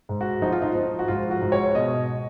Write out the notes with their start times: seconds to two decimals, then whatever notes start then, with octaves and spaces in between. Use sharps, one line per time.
0.09 G#2
0.21 F#4
0.42 F3 D#4
0.52 F4
0.62 D#4
0.75 F3
0.99 F#4
1.08 G#2 F4
1.31 F#4
1.42 G#2
1.52 C#5
1.75 B2 D#5